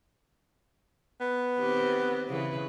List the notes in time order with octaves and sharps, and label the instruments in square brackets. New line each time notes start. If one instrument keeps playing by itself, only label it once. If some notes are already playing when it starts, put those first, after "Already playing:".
[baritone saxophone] B3
[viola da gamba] D#3 C4 G4
C#3 E3 B4